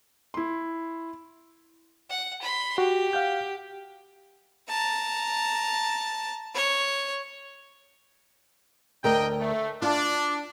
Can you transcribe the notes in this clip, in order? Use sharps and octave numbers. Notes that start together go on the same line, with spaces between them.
E4 C6
F#5
B5 C6
F#4 G4
F5 F#5 G6
A5 A#5
C#5
D2 D4 A#4 D#5 G5
A3
D4 F4